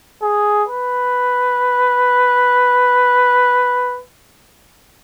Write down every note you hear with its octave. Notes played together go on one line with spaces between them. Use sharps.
G#4
B4